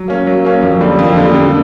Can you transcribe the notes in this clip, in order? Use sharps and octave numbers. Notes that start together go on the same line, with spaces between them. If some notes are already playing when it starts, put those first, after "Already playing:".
Already playing: F#3
A#3 C#4
F#3
A#3 C#4
F2
D3 G3 A#3
F2
D3 G3 A#3
D3